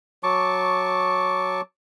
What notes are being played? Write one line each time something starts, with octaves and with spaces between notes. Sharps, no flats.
F#3 A5 C#6 D6